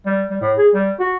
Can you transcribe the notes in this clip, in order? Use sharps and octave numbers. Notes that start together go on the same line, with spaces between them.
G3
G3
A2
G#4
G3
F#4